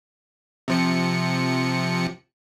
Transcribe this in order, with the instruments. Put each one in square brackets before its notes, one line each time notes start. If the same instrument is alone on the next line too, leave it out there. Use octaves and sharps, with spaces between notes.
[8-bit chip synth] C3 F3 C#7